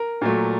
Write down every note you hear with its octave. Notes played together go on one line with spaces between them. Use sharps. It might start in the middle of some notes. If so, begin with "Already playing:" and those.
Already playing: A#4
A#2 F#3 A3